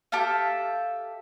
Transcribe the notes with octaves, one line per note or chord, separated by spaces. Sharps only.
G4 A4 E5 F5